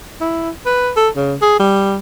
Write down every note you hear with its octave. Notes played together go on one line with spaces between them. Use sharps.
E4
B4
A4
C#3
G#4
G3